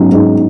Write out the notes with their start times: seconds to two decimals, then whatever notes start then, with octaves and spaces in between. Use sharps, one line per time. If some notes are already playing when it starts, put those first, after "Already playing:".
Already playing: G#2 F#3 C#4
0.12 G#2